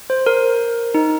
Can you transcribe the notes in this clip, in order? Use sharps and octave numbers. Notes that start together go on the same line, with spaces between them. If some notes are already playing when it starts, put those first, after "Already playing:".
C5
A#4
D#4